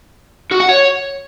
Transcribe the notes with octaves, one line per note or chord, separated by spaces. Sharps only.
F#4
F#5
C#5